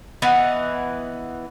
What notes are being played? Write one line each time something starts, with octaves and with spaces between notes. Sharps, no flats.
E3 B3 D#5 F#5